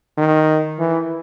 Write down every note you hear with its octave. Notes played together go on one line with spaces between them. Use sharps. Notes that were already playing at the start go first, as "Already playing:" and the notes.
D#3
E3